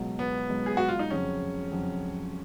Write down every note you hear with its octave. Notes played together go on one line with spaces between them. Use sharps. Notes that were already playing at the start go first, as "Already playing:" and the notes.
Already playing: C#2 B2 F#3
B3
C#2 B2 F#3
G#4
F#4
F4
D#4
F2 C#3 F#3 C#4
F2 C#3 F#3